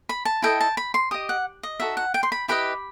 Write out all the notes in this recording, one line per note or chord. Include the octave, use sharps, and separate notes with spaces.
B5
A5
E4 A4 D#5 G5
A5
B5
C6
G4 D#5 D#6
F#5
D#5
D#4 F#4 A4 E5
F#5
G5
C6
B5
E4 G4 B4 D#5 B5